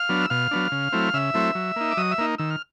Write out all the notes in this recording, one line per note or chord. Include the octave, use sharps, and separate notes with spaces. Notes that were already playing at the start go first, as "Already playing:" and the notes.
Already playing: F5 F6
F#3 B3 D4
E6
B2 F5 F6
F#3 B3 D4
C#3
F#3 A3 C4 E4
C#3 E5 E6
F#3 A3 C4 E4
F#3
A#3 D#4
D6
F#3 D#5 D#6
E5 E6
A#3 D#4
D#3 E6
F6